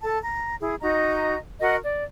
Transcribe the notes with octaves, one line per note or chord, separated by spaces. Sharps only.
A4 A5
A#5
E4 G#4
D#4 F#4 D#5 A#5
F#4 A#4 D#5 F#5
D5